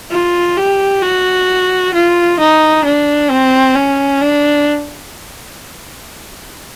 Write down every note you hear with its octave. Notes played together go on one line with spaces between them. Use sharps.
F4
G4
F#4
F4
D#4
D4
C4
C#4
D4